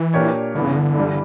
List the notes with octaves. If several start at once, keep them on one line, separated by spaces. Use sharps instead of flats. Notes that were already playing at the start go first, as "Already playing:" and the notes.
Already playing: E3
A#2 A#3 D4 G4 C#5
G2 D3 E3 B3
C#3
D3
G2 E3 G3